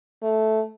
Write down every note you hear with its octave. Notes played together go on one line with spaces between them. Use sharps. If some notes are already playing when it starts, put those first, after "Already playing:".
A3